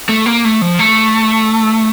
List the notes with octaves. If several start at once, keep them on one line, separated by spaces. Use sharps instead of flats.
A3
A#3
A3
F3
A3